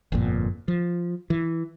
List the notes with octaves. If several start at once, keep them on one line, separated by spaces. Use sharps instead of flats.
G1 F2 A#2
F3
E3